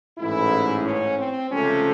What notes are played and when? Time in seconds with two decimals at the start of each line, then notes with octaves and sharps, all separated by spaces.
0.18 A1 G#2 E3 E4
0.84 C#4
1.18 C4
1.51 C#2 C3 F3 A3 C#4